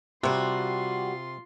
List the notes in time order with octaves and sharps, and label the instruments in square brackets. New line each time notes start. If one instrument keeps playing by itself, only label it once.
[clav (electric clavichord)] C3 [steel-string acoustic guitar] G3 F#4 [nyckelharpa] F4 C6